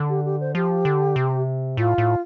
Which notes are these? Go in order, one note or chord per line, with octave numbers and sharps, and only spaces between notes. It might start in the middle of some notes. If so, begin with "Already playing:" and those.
Already playing: D3
G4
G4
C5
F3 G4
D3
C3
A2 F4
A2